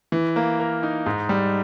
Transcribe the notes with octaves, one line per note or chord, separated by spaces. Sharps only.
E3
A#3
A#4
D#4
G#2
G3